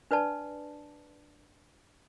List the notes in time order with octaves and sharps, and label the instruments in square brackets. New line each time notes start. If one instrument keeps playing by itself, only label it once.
[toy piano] D4 B4 D5 A5